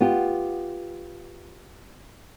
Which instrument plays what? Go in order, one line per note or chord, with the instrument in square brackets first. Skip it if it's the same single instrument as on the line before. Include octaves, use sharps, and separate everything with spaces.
[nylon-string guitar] B3 F4 G4